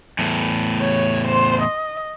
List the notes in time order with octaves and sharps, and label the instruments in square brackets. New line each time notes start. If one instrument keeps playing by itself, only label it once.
[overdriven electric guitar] E2 A2
[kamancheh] C#5
C5 C6
D#5